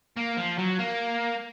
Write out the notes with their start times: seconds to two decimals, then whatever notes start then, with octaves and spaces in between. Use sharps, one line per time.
0.17 A#3
0.37 F3
0.58 F#3
0.79 A#3